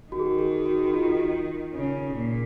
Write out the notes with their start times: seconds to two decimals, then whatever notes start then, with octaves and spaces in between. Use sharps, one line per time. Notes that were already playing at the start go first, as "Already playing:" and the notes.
0.12 D#3 F#4
0.20 G#4
0.26 F#4
0.39 G#4
0.66 F#4
0.85 F#4
0.94 F4
1.75 C#3
2.15 A#2